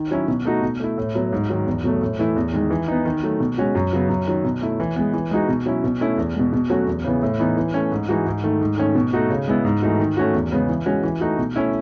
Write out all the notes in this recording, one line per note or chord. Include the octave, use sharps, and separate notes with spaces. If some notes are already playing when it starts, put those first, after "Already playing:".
Already playing: D#3
F#3 C#4 E4
B2
A3 D#4 F#4
B2
A3 E4
A2
F#3 B3
G#2
D#3 F#3
E2
B2 F#3 A3
A2
E3 A3 E4
E2
D#3 G#3
E3
B3 D#4
D#3
F#3 A3
B2
G#3 C#4 F#4
F#2
C#3 F#3 B3
F#2
D#3 F#3
B2
A3 E4
E3
G#3 B3
E3
G#3 D#4 F#4
B2
F#3 C#4 E4
B2
A3 C#4 E4
E2
B2 G#3
B2
F#3 A3 C#4 F#4
E2
C#3 E3 B3
A2
E3 B3 D#4
E3
A3 C#4
G#2
E3 G#3 D#4 F#4
G#2
D#3 A3
G#2
D#3 A3 C#4
B2
A3 D#4 F#4
C#3
G#3 B3 E4
G#2
E3 A3 D#4 F#4
D#3
A3 C#4 F#4
E2
C#3 G#3 B3
E3
G#3 C#4 F#4
E3
A3 D#4 F#4
B2
A3 C#4 E4